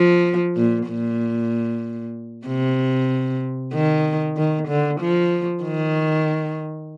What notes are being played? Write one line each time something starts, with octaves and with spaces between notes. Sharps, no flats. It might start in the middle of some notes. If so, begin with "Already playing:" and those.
Already playing: F3
A#2
A#2
C3
D#3
D#3
D3
F3
D#3